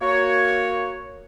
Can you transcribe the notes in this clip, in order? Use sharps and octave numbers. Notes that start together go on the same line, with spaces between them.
A#3 F#4 C#5